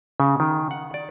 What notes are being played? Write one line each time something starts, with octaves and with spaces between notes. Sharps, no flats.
C#3
D#3
F#5
D5